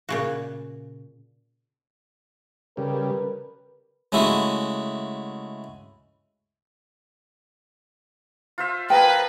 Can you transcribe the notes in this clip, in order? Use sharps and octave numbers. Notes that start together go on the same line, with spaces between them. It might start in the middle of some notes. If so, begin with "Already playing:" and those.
A#2 C#3 F#4
C#3 G3 A#4 B4
C#3 G#3 A3 E4 F#4
F4 C5 E5
F3 A#4 B4 G5 G#5